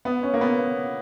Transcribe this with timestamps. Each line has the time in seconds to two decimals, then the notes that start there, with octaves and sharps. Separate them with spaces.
0.05 B3
0.23 C#4
0.34 A#3
0.41 B3